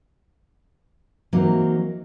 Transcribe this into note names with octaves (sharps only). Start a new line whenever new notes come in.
E3 F#3 A#3 C4 D#4